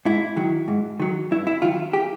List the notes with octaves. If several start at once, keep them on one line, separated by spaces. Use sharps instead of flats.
G#2 E4
D#3 F#3
G#2
D#3 F#3
G2 E4
E4
D#3 F#3 F4
G4